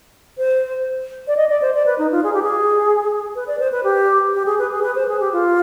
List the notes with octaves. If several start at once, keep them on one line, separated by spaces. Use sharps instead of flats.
C5
D5
D#5
D5
C5
D5
B4
D#4
F4
G#4
G4
G#4
B4
D5
C5
B4
G4
G4
G#4
B4
G#4
B4
C5
G#4
G4
F4